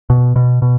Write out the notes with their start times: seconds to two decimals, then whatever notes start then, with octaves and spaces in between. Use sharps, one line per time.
0.10 B2
0.36 B2
0.62 B2